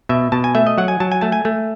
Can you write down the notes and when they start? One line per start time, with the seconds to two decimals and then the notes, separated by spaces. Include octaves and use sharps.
0.09 B2 E5
0.32 B2 A5
0.44 G#5
0.55 A3 E5
0.67 D#5
0.78 F#3 F#5
0.88 G#5
1.00 F#3 A5
1.12 G#5
1.21 A3 A5
1.32 G#5
1.45 A3